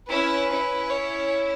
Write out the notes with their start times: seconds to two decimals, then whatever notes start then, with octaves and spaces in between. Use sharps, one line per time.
0.10 C#4 E4 B4
0.51 C#4 E4
0.90 C#5